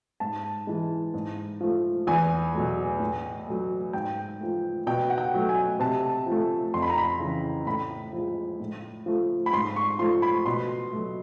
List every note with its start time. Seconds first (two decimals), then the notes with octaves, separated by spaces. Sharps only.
0.20 G#2 A5
0.67 E3 G#3
1.14 G#2
1.61 F3 A3
2.07 E2 G#5
2.53 B2 F#3 A3
3.00 A2
3.47 F#3 A3
3.93 G#2 G5
4.40 F3 A3
4.87 B2 G5
5.10 F#5
5.18 G5
5.34 F#3 A3
5.49 G#5
5.80 C3 A5
6.26 F3
6.32 A3
6.74 F2 C6
6.82 B5
6.90 A#5
6.98 B5
7.20 C#3 E3
7.66 A2 B5
8.13 F3 G#3
8.60 A2
9.06 F3 A3
9.46 B5
9.53 G#2 C6
9.76 C#6
9.99 F3 A3 C6
10.22 B5
10.46 B2 C6
10.93 F#3 A3